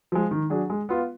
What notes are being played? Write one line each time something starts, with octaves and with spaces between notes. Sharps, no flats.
F3 G#3
D#3
F#3 D4 G#4
G#3
B3 F4